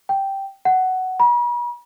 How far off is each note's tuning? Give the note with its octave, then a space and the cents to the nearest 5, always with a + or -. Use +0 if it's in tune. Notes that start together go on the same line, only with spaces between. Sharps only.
G5 -5
F#5 +10
B5 -45